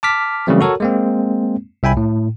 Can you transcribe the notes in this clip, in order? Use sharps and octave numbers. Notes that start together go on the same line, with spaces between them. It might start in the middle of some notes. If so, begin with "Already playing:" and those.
A5 D6 F6 B6
C#3 E3 F#3 G3 A3 C4
F#4 A4 A#4 C#5
G#3 A#3 C4
C2 E5 G5 G#5 B5
A2